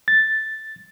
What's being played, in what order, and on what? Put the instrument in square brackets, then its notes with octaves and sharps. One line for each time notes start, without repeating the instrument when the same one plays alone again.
[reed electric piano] A6